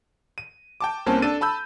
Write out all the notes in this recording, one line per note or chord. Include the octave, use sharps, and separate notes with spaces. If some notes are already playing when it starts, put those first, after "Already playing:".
D#7
G5 A5 D6
C2 A#3 C4 C#4 A5
D4 A4 A6 D#7
A5 B5 E6 G6